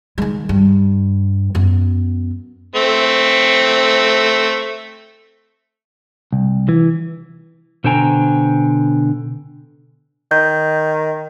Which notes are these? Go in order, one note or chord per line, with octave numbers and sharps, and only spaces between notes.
D#3 G#3
G2
F#2 B3
A3 C4
C2
E3
B2 D3 C5 G5 G#5 A#5
D#3 G6